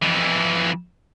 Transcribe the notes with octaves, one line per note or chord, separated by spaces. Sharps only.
F2 E3